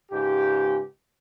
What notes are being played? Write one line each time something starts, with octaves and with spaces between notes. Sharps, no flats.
C#2 G#2 G4